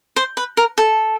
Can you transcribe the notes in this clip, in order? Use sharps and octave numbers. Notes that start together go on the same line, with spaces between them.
C5
B4
A#4
A4